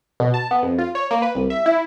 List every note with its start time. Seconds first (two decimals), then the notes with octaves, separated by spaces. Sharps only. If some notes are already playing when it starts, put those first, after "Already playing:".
0.20 B2
0.34 A5
0.51 B3
0.63 F2
0.78 F4
0.95 C#5
1.11 A#3
1.22 B4
1.35 C2
1.50 E5
1.66 E4